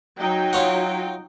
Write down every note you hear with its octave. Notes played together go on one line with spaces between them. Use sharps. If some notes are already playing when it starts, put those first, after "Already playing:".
F#3 D#4 G5
F4 C#5 F#5